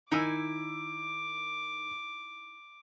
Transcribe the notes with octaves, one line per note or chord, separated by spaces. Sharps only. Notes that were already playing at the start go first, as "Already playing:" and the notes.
D#3 D#4 E4 G#5 D6 E6